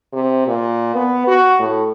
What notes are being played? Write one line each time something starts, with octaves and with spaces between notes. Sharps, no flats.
C3
A#2
B3
F#4
A2